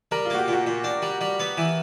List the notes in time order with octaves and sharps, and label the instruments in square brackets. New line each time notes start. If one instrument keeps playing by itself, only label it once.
[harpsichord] G3 [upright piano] A#4
[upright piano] F4
[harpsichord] A#3 [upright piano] F#4
[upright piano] G4
[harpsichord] A#2 [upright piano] F#4
[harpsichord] A#2
D4
G3
G3
B3
E3